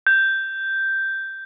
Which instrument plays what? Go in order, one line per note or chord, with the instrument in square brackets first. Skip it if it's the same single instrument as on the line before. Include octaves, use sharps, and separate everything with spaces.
[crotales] G6